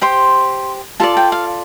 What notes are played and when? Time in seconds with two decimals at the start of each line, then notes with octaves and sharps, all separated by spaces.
0.01 G4 C5 C6
1.00 F4 A4 D5 A5
1.17 G5
1.32 F5